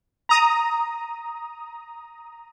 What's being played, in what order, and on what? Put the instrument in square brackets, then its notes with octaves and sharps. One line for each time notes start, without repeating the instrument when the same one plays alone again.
[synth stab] A#5 D#6